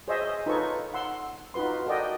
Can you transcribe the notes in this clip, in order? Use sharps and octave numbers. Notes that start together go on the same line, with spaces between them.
G#4 C5 C#5 D#5 E5 G#5
D#4 F4 A4 B4 C#5 C#6
F#5 C6 E6
D#4 F4 F#4 B4 C6
F#4 A4 A#4 D5 D#5 G5